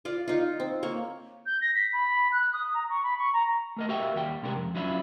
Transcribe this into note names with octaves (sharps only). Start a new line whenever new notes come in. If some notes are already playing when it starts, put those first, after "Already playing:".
F4 D5
D#4 F4
C4
A#3 C#5
G6
A#6
B6
B5
F#6
D#6
A#5
C#6
B5
C#6
A#5
A3 A#4 D#5
F#4 G4 A#4 E5 F5 G5
D#2 G3 G5
C3 G#3 D4 G4 A#4
F2
F#3 C#4 D4 E4 F4